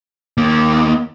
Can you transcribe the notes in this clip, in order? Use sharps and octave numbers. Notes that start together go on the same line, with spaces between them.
D#2 A#3